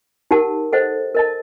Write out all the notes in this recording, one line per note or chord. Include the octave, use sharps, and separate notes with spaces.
D#4 G4 A#4 F#5 A5
A4 C5 D#5 F#5
A#4 D#5 A5